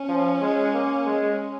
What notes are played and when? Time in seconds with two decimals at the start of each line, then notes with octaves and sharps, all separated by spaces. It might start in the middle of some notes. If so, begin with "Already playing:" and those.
Already playing: C#4
0.09 F3
0.41 G#3
0.74 A#3
1.06 G#3